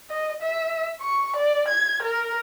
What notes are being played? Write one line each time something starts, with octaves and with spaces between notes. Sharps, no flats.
D#5
E5
C#6
D5
G#6
A#4